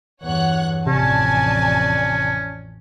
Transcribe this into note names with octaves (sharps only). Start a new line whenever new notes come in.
E2 G2 C#5 F#5 F#6
A1 F2 C3 C#4 D5 G#5 A5